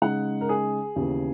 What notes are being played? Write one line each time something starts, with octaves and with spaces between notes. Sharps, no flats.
C#3 G#3 D#4 F#5
A#4
G#4
D#2 C#3 E3 B3